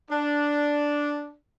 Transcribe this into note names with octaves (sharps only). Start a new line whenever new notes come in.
D4